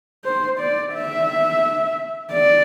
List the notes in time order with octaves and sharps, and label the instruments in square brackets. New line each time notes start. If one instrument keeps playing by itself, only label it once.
[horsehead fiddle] C5
D5
E5
D5